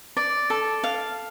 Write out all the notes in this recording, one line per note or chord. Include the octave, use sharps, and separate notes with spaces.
D5
A4
F5